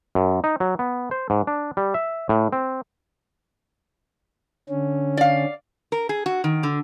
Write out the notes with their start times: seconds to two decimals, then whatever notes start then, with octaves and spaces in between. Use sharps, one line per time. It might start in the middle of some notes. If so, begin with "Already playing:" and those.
0.15 F#2
0.44 D#4
0.60 F#3
0.79 B3
1.11 C5
1.30 G#2
1.47 D4
1.77 G3
1.94 E5
2.29 A2
2.53 C4
4.69 D3 C#4
5.17 D5 F5
5.92 A#4
6.09 G#4
6.26 F#4
6.44 D#3
6.63 D3